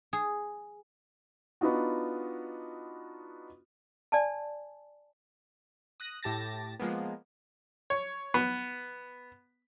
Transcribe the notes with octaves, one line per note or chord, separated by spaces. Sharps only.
G#4
B3 D4 D#4 F4 F#4
D5 G#5 A5
D#6 F#6 A#6
A2 G4 A5 A6 A#6
F3 G#3 A#3 B3
C#5
B3